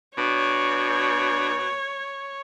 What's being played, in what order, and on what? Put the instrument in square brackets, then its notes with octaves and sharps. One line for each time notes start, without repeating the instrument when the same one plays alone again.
[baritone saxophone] B2 [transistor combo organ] D4 [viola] C#5